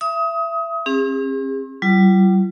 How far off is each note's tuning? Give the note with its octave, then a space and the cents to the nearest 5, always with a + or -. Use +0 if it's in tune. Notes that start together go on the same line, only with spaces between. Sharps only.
E5 +25 D#6 +25
C4 +45 G#4 -45
G3 -45 F4 -35